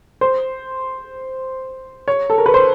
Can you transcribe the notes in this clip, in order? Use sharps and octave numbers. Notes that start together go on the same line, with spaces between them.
C5
C#5
A4
A#4
B4
C5